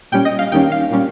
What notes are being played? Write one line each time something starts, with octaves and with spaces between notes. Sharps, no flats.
A#2 G3 C#4 G5
D#5
F5
D#2 D#3 G3 C#4 G5
F5
A#2 G3 C#4